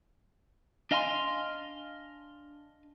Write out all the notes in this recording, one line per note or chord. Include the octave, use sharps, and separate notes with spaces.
D4 D#5 F5 G#5 A5 C6